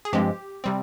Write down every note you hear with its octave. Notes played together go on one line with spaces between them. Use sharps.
G#4
G2 F3 G#3 C4 G4
C3 G3 C4